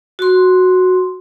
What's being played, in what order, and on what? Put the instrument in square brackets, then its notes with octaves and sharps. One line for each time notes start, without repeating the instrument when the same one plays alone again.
[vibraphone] F#4 C6